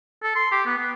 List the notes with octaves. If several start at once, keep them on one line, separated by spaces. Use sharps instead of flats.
A4
C6
G4
B3
B3